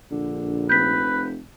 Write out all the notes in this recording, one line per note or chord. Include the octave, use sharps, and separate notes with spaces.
A#1 D3
F1 B4 G6 B6